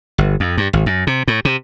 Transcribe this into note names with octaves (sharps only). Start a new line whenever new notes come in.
G1
F2
G2
G#1
F#2
C3
A2
C3